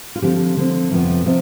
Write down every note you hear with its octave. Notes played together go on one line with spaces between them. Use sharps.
F4
D3 F3 C4 G4
D3 F3 C4
F2 C3 F3 B3
C3 F3 C4